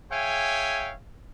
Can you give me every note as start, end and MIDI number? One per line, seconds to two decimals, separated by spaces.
0.11 0.93 68
0.11 0.93 73
0.11 0.93 76
0.11 0.93 77
0.11 0.93 79
0.11 0.93 80